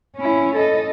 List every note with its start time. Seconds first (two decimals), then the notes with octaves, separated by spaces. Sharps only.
0.17 C#4 E4
0.55 A4 D#5